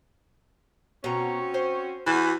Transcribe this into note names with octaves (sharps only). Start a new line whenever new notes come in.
B2 C4 C#4 F#4 A#5
C5
E3 F#4